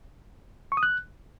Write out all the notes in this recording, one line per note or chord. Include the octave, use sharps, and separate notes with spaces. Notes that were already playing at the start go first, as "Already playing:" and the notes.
C#6
D#6
F#6